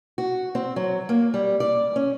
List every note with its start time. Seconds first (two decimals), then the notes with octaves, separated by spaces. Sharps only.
0.18 F#4
0.55 C4
0.76 F#3
1.09 A#3
1.34 G3
1.60 D5
1.96 C#4